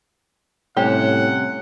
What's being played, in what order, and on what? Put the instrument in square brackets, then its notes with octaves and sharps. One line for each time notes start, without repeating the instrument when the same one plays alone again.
[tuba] A2 [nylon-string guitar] C3 G3 C#4 [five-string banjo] G4 [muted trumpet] F#5